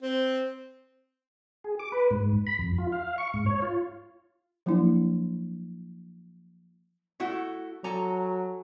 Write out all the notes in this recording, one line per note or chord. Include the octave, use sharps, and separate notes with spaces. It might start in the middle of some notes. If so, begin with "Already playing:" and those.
C4
G#4
D6
B4
G#2
B5
F2
F4
F5
C#6
G#2
C#5
F4
F3 F#3 A#3 D4 E4
A3 E4 F#4
F#3 A4 G#5 A#5